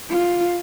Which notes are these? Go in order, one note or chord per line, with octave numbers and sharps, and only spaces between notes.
F4